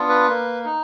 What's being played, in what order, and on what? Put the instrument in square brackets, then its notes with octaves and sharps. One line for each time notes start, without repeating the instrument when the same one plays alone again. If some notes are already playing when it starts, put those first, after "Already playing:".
Already playing: [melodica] B3 D4 F4
B4
A#3
D#4